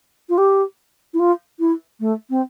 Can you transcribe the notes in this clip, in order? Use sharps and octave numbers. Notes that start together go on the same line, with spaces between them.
F4
G4
E4
F4
E4
A3
C4